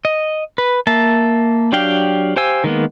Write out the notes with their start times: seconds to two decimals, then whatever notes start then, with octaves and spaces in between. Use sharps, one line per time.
0.05 D#5
0.58 B4
0.87 A#3 E5 A5
1.72 F#3 D4 G4 F5 G5
2.36 G4 C5 F5 G#5 E6
2.64 D#3 G#3 A#3 B3